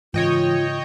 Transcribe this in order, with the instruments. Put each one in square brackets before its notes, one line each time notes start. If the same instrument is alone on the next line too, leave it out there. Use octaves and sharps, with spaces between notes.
[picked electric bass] G#2 C#3 [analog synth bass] E3 [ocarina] F4 [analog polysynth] C#5 D#5 G5